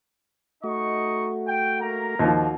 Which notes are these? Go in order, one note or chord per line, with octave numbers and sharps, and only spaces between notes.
A3 D#4 F#4 D#5 C#6
G5
A#3 A#4 A#5
D#2 F3 D#4 F#4